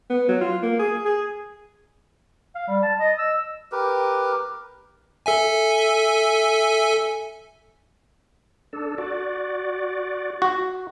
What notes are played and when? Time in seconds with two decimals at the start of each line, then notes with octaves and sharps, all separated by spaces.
0.10 B3
0.29 F#3
0.41 F4
0.63 A#3
0.79 G#4
1.05 G#4
2.55 F5
2.68 G3
2.83 A5
2.99 D#5
3.19 E6
3.72 G4 A#4 B4
5.26 A4 E5 G#5
8.73 D4 A4
8.98 F#4 D5
10.42 F#4